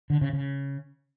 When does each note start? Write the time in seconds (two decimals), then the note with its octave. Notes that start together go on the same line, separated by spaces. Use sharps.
0.10 D3
0.21 C#3
0.33 C#3